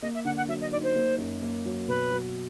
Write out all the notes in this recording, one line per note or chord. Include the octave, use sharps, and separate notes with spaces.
A#3 D#5
E5
D3 F#5
F#5
F#3 E5
D#5
D#4 D5
C5
A#3
F#2
A#3
F#3
B2 B4
F#3